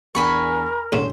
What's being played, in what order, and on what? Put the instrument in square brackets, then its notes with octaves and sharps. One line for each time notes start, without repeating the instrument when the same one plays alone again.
[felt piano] E2 D4 [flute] A#4 [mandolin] G#5 B5 C#6
[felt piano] E1 C#5 [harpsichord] A2 C#3 [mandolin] C5